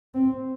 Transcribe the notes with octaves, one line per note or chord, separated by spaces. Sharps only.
C4